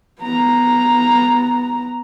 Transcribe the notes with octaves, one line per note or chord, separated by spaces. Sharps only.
B3 A#5